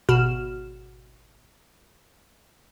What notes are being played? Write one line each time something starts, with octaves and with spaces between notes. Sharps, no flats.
G#1 B2 F#4 F6 E7